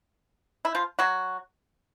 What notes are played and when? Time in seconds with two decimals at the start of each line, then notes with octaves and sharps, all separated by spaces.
0.65 E4
0.75 F3 F4
0.99 F#3 F#4